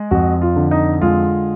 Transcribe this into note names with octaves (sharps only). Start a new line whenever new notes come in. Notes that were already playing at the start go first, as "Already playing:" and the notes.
Already playing: G#3
F2 F#4
F4
D3
D#4
G#3 F4